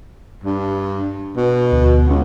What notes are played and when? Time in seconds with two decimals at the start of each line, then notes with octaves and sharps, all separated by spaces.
0.43 G2
1.37 B2
1.72 D2
2.07 C#2 B3 C#4